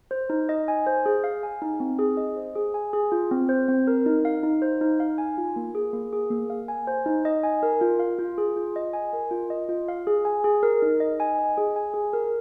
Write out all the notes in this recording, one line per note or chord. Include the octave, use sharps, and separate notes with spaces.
C5
D#4
D#5
G#5
C5
G#4
F5
G#5
D#4
C4
G#4
D#5
C5
G#4
G#5
G#4
F4
C4
C5
C4
A#4
D#4
F5
D#4
C5
D#4
F5
G#5
F4
A#3
G#4
A#3
G#4
A#3
F5
G#5
C5
D#4
D#5
G#5
A#4
F4
F5
F4
G#4
F4
D#5
G#5
A#4
F4
D#5
F4
F5
G#4
G#5
G#4
A#4
D#4
D#5
G#5
D#5
G#4
G#5
G#4
A#4